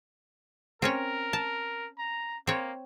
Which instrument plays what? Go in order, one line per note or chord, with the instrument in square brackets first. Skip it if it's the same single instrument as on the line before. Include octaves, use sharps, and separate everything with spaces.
[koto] C4 C#4 C#5 [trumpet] A#4
[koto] A5
[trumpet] A#5
[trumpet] A#3 [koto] C4 C#5